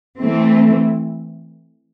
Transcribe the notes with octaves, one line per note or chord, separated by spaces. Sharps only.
E3 A3 C4